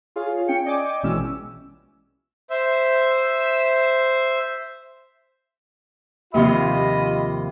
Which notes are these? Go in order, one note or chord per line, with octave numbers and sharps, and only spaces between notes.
F4 G#4 C#5 F5
C#4 G5 C#7
D5 D#5 G5 G#5 D6
A#1 B2 E3 G#3 C#4 E6
C5 E5
D#2 C3 F3 F4 D#5 B5